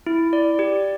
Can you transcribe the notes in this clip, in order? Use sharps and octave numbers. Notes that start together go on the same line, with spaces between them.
E4
D5
G4